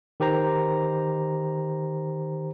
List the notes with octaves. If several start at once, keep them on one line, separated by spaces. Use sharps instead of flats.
D#3 G4 C5 A#5